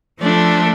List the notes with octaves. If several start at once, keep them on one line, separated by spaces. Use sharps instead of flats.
F3 A3 D4 A4